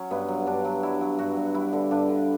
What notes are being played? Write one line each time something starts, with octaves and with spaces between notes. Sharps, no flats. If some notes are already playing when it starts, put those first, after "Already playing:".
Already playing: F#3 C#4
G2 B3
F#3
G2 D4
F#3
G2 E4
F#3
G2 F#4
G2
G3 E4
D3
G2 D4
D3